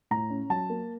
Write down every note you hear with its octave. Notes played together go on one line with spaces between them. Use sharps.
A2 A#5
C#4
F#3 A5
A#3